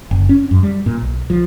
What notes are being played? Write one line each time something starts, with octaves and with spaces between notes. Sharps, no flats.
F#1
C#4
F#2
G3
A#2
B1
F3